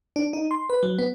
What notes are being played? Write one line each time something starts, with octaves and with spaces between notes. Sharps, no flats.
D4
D#4
C6
B4
F#3
B3